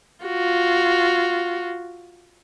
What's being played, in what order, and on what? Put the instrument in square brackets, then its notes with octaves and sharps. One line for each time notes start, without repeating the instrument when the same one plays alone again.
[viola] F4 F#4